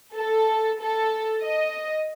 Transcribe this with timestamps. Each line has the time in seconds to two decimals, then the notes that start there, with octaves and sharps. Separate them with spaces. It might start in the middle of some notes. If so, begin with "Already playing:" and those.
0.16 A4
0.81 A4
1.42 D#5